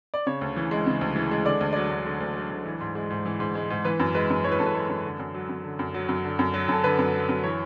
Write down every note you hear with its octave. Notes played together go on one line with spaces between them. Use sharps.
D5
C#3 C#5
D2
E3
G#3
C#3
D2
E3
G#3
D3 D5
D2
F#3 D5
D2
D3
D2
F#3
D2
E3
G#2
G#3
G#2
E3
G#2
G#3
G#2
E3 B4
F#2
G#3 B4
F#2
E3 C#5
B4
F#2 A4
B4
G#3 A4
F#2
D3
F#2
F#3
F#2
D3
F#2
F#3
F#2
D3
F#2
F#3
F#2 A4
D3 B4
F#2
F#3
F#2
E3 C#5